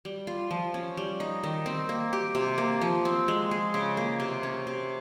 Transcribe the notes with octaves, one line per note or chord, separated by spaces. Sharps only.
G3
F4
F3
C#4
G3
D#4
D#3
C4
A#3
G4
C3
A#3
F3
C4
G#3
G#4
C#3
A#3
C3
C#4
C3